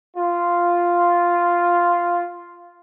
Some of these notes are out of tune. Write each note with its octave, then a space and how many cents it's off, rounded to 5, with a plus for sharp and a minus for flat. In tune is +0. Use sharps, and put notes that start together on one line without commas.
F4 +0